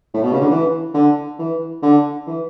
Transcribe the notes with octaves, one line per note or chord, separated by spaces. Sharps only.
A2
B2
C#3
D3
E3
D3
E3
D3
E3